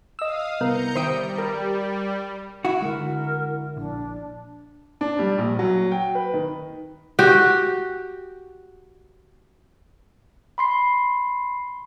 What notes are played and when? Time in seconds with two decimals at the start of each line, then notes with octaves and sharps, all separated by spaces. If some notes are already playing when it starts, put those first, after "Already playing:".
0.19 D#5 F5 D#6 E6
0.61 C2 B3 A#4 A#5 G6 C#7
0.96 D#3 G3 C5 E5 G5 D#6 D7
1.39 A#4
2.65 E4 F#4
2.82 D3 G#3 A#4
3.77 A#1 D4
5.01 D4
5.19 G3
5.38 A#1
5.59 F#3
5.92 G5
6.15 B4
6.34 D#3
7.19 F#4 G4
10.58 B5 C6 C7